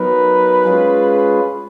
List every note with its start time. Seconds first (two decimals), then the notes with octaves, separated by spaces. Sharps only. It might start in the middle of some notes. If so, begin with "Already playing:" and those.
Already playing: F#3 B3 D#4 A#4 B4
0.64 G#3 C#4 F4 G#4